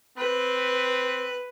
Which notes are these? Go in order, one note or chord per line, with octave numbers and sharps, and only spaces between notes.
C4 B4